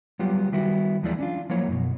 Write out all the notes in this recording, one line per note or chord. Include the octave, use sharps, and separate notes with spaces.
F#3 G3 B3 F4 G4
D#3 G3 B3 E4 F#4
D#2 E3 F3 G#3 E4 D5
C#4 D4 F4
F3 F#3 A#3 E4 C#5
F#2 B2